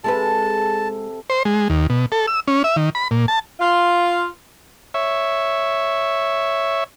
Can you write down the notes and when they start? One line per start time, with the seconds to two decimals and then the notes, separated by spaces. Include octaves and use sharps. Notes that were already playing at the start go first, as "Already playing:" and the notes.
0.04 C3 G#3 G#4 A4 B4 A5
1.30 C5
1.45 G#3
1.70 D#2
1.90 B2
2.12 A4
2.28 E6
2.48 C#4
2.64 E5
2.76 D#3
2.95 B5
3.11 A#2
3.28 A5
3.60 F4
4.94 C#5 E5